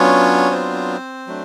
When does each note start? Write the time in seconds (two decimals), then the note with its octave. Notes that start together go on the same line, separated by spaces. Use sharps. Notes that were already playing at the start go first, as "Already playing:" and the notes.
Already playing: F#3 B3 C#4 D4 F4 C#5
0.51 C4 C5
1.27 F#3 A3 D4